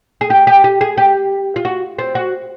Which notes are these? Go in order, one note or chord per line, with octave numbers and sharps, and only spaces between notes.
G#4
G4
G4
G4
G#4
G4
F4
F#4
C4
F#4